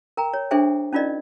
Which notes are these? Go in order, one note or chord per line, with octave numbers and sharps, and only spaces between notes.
A#4 G5 A#5
C#5
D4 G#4 A4 C5 E5 G5
C#4 D#4 F4 A#4 D5 D#5